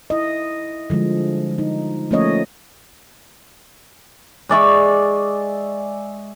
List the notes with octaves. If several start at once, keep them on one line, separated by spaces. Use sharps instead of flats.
E4 D#5
D3 F3 G3 G#3
D#4
F3 A3 A#3 C#4 C#5 D#5
G#3 D5 E5 C#6